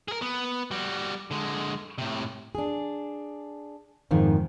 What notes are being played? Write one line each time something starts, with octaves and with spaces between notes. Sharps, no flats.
G#4 A#4
B3
G3 F#4
D3 G#3
A2 C3
D4 G#4
F2 G#2 D#3 F3